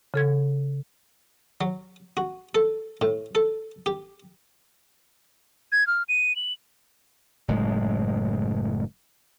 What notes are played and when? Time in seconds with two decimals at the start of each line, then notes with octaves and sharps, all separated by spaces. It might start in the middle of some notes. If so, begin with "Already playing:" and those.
0.14 C#3 A4 G#6
1.61 F#3
2.17 F#4
2.55 A4
3.01 A2
3.35 A4
3.86 G4
5.72 G#6
5.87 F6
6.09 D#7
6.36 F#7
7.48 F#1 A2 G#3